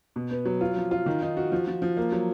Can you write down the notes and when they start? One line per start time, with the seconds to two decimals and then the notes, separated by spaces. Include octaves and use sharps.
0.16 B2
0.31 B3
0.45 F#3
0.61 F4
0.77 F3
0.91 F4
1.06 D#3
1.22 D#4
1.37 F#4
1.52 F3
1.68 F3
1.82 F3
1.97 A#3
2.12 F#3